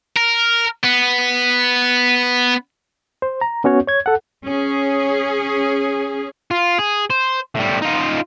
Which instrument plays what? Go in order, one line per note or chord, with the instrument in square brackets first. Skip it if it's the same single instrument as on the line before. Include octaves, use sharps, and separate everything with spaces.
[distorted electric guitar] A#4
B3
[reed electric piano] C5
A#5
B3 C#4 F#4 C#5
C#5 G#6
A4 F#5
[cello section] C#4 G#4
[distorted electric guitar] F4
G#4
C5
A2 G3
D#4 F4